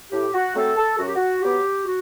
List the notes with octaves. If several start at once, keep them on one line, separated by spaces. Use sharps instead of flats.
A2 G4
F#4
F#3 A3 C4 A4
A4
F#2 F#4
G4
F#4
F#3 B3 G4
F#4